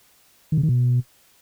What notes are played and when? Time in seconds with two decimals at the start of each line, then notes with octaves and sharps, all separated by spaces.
0.52 D#3
0.58 C#3
0.63 D#3
0.69 B2